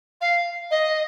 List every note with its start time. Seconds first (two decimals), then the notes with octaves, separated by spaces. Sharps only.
0.21 F5
0.71 D#5